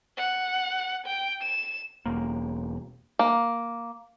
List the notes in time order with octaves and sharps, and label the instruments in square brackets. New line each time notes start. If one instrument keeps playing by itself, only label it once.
[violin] F#5
G5
E7
[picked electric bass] E1 A#3
[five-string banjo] A#3